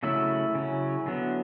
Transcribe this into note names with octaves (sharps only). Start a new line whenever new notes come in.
C#3 F#3 A3 C#4 E4 E5
C#3 F#3 C#4
D3 F#3 B3